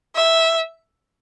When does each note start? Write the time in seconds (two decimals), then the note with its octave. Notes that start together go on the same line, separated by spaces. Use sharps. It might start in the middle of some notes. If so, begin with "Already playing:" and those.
0.15 E5